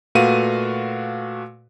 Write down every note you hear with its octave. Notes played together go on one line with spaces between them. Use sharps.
A#2 A3 F#4 B4 F5 D#7